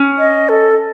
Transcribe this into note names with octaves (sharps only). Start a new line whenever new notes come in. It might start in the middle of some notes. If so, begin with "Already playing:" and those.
Already playing: C#4
D#5
A4